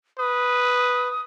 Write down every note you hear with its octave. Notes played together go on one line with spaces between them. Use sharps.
B4 D#6